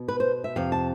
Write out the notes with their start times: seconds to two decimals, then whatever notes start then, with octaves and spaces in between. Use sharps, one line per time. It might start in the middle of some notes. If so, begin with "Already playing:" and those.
Already playing: B2
0.08 B4
0.20 C5
0.44 E5
0.56 F2 C3 F5
0.72 A5